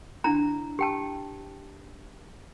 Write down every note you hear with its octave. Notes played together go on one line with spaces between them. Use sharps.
D4 E4 A#5
G4 G5 A5